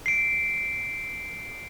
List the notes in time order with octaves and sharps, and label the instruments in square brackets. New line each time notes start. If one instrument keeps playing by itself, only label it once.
[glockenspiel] C7 D7